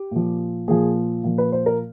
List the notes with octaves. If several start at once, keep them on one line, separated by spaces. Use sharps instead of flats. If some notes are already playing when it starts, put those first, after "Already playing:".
Already playing: G4
A#2 F3
A#2 F3 G#4
A#2 F3
B4
C5
A#4